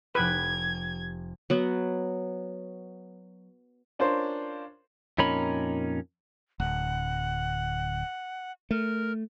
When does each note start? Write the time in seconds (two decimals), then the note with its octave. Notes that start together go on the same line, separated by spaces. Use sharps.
0.15 F1 G4 B4 G#6 B6
1.50 F#3 B3
3.99 C#4 D4 F4 A#4 C5 C6
5.18 F2 A#2 C#4 D#4 A#4 B5
6.60 D1 F#5
8.71 A3 A#4